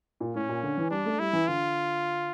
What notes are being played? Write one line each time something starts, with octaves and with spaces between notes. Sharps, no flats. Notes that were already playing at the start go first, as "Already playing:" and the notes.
A#2
A2 C#4
A#2
D3
E3
G3 D4
A3
G3 E4
E3
D3 F4